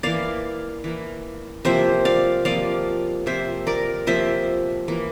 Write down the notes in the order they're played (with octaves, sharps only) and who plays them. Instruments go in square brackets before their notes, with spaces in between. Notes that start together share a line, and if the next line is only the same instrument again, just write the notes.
[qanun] E3 A#3 D5 F5
E3 A#3
C3 F3 A#3 C5 E5
D5 F5
C3 F3 A#3 D5 F5
C3 F3 A#3 C5 E5
A#4 D5
C3 F3 A#3 C5 E5
E3 A#3